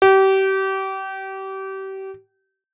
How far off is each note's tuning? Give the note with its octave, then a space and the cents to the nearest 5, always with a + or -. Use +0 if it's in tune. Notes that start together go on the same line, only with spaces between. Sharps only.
G4 -30